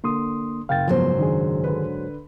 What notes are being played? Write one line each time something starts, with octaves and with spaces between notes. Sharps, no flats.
D3 A#3 C6 D#6
F#1 F5 G5 A6
G#2 F3 F#3 B3 C5
D#3 D4 G#4
D3 B4